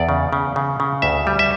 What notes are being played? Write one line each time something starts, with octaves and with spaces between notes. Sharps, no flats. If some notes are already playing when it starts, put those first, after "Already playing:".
Already playing: E2 D5
C#3
C#3
C#3
C#3
D2 E5
G3
E5